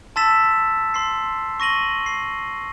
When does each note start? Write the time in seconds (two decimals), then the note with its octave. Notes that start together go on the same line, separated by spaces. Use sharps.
0.16 A5 C6 E6 A6 B6 E7
0.94 C6 C7
1.60 C#6 A#6 D#7 F#7 G7
2.06 C7